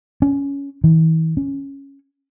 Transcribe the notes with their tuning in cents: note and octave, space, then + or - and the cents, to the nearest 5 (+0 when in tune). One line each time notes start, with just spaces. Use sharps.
C#4 +15
E3 -40
C#4 -5